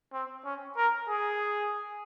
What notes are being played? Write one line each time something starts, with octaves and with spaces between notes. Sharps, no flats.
C4
C#4
A#4
G#4